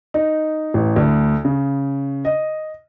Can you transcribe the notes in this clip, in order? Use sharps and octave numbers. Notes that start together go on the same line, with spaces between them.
D#4
A1
D2
C#3
D#5